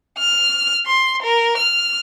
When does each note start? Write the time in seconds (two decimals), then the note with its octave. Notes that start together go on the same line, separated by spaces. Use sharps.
0.18 F6
0.86 C6
1.22 A#4
1.57 F6